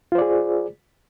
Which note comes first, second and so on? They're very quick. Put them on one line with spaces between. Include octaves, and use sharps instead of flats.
F4 C5 D5 G#4